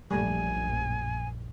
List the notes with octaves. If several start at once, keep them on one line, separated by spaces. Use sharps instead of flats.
A#1 F#2 G3 A3 G#5